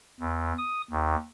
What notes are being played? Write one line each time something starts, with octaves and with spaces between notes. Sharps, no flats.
E2
D#6
D#2